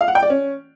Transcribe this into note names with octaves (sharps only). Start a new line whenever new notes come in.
F5
F#5
G5
D5
C#4